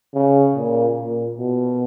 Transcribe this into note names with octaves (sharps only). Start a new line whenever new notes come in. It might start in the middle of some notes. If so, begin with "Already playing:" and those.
C#3
A#2
A#2
B2